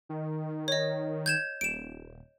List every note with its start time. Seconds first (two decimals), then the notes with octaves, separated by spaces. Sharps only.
0.09 D#3
0.68 C#5 D#5
1.26 G6 G#6 E7
1.61 D#1 D7 E7